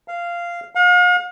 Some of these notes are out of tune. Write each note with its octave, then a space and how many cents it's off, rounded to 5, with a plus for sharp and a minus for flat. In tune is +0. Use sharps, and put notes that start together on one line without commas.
F5 -10
F5 +45